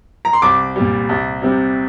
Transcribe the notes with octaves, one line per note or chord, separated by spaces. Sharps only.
A#5
C6
C2 D6
A#2 G3
C2
C3 G3